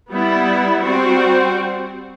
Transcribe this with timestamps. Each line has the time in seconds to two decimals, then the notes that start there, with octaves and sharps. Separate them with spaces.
0.11 G3 B3 E4
0.84 G3 C4 F#4 C5